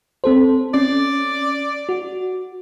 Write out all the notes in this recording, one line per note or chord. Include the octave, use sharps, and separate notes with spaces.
C4 A4 C5
C#4 D5
F#4